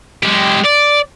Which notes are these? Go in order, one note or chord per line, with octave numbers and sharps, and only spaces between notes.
G#3 G4
D5